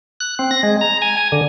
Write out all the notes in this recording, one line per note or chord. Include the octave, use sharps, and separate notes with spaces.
F#6
C4
A#6
G#3
A#5
G#5
G#5
D3